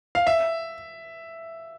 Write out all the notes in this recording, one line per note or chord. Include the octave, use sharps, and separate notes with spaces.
F5
E5